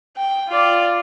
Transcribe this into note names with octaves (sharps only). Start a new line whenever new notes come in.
G5
F4 D5